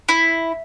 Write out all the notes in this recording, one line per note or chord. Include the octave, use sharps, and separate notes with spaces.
E4